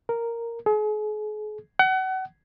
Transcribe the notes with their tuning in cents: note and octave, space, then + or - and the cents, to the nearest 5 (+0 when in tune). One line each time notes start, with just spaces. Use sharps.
A#4 -5
G#4 +40
F#5 +30